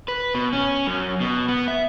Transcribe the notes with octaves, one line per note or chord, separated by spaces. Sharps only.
B4
B2
C#4
F#2
B2
B3
E5